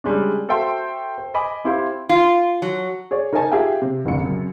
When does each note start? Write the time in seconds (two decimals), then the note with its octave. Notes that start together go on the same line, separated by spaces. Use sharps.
0.04 C#3 G3 G#3 C#4 D4
0.48 F#4 A4 C5 E5 G5 C6
1.18 C5
1.34 D#5 G#5 B5 D6
1.64 C4 E4 G4 C5 F5 C6
2.09 F4
2.62 F#3
3.11 G#4 C#5 D5
3.33 D#4 A#4 C5 D#5 G#5 A5
3.52 F4 G4 G#4 E5 F5 G5
3.82 C3
4.05 F1 A#1 D3 C#7
4.21 F#2 C#3